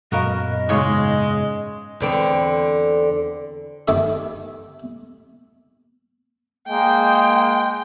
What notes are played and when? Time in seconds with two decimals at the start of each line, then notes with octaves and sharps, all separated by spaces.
0.12 F#2 A#2 B3 F#4 A#4 D#5 F5
0.69 G#2 C#3 G#3 C#5
2.00 E2 D3 C4
3.88 G2 D#3 A3 B3 E5 D6
6.69 G#3 A#3 G5